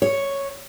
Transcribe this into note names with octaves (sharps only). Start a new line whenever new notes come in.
C#5